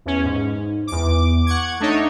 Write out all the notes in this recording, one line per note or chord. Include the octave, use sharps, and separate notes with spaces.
E2 C#4
G#2
E2 D6
F#5 C#6 G#6
A3 D4 D#4 C#5